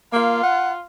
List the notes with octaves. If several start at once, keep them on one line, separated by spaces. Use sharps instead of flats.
A#3 F4
F#5